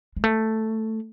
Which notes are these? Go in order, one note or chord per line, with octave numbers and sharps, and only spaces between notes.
G#3
A3